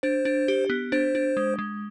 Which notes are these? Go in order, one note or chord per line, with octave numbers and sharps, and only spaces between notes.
D4 C5
D4
G4
B3
D4 C5
D4
G#3
G#3